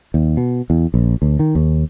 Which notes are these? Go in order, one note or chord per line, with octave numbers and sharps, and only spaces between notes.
D#2
B2
E2
A#1
D2
D#3
D#2